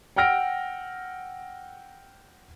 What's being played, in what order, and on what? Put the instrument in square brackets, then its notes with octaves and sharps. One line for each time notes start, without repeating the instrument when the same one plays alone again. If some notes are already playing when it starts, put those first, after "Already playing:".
[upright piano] F#5 G5 E6 F6 A#6 D7